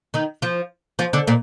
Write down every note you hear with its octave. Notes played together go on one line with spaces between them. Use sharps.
D#3 D#4
F3 F4
F3 F4
D3 D4
A#2 A#3